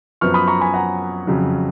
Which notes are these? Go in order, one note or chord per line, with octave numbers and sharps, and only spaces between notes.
F#2 F3 B3 C#6 F6
B5 D#6
A#5 C#6
G#5 B5
F#5 A#5
F2 C#3 F#3